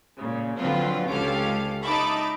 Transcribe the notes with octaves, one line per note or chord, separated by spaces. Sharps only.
A#2 C#3
D3 F3 F#3 C4 F4 B4
C#2 C#4 G4 A4 F5 D6
D#4 E5 A5 B5 D6